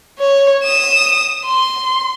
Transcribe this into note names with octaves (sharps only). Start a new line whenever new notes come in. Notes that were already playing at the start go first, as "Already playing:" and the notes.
C#5
D#6 E7
C6